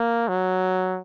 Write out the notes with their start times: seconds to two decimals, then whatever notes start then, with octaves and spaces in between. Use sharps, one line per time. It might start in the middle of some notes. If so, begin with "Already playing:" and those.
Already playing: A#3
0.28 F#3